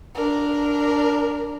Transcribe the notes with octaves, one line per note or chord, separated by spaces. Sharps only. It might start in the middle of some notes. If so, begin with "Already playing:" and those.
D4 A#4